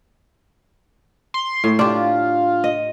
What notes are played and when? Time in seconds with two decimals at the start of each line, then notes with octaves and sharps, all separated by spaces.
1.34 C6
1.64 A2
1.79 D4 F4 G4
2.64 D#5